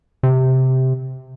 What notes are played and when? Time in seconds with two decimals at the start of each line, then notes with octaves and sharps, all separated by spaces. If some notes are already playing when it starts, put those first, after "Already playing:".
0.23 C3